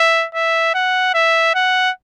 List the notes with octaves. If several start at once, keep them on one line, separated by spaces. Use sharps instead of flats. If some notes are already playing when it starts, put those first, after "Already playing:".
Already playing: E5
E5
F#5
E5
F#5